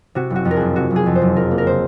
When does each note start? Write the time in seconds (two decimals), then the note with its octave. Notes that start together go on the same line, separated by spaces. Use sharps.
0.15 C3 F#4
0.30 F#1
0.36 F#4
0.45 F2
0.51 A#4
0.56 F#1 G#4
0.76 C3 F#4
0.90 F#1
0.96 G#4
1.06 F2
1.15 C5
1.21 F#1
1.36 F3 A#4
1.51 A#3
1.58 A#4
1.66 C#3 C5